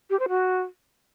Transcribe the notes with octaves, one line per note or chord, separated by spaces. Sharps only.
G4
C5
F#4